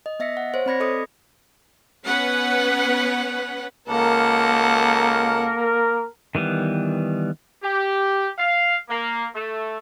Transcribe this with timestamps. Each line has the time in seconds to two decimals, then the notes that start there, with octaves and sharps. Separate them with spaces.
0.06 D#5
0.19 B3 D#5 E5 A#6 B6 C#7
0.37 F#5
0.54 C5 C#5
0.66 C4 D5 B5 G#6 A#6 C#7
0.80 A4 D#5 D6 D#6 C#7
2.05 B3 C#4 B4 F#5
3.88 C#2 A#3 A4 A#4 F#5
6.35 D#3 E3 G3 B3
7.63 G4
8.37 F5
8.89 A#3
9.35 A3